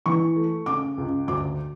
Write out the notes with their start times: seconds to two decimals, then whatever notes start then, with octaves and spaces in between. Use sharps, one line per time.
0.06 E3 C#6
0.36 A3
0.66 C#3 D6
0.98 C#2
1.28 D2 D6